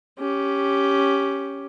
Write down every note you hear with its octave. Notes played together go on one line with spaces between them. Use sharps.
C#4 G4